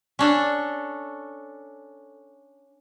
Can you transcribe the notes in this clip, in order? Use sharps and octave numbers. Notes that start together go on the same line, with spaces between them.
C#4 D4 A4